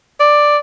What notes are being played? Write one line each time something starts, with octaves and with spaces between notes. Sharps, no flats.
D5